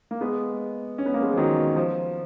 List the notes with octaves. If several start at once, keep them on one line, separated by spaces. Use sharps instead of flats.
A#3
G#3 B3
C#4
B3
A#3
G#3 B3
F3
D#3 F#3
F3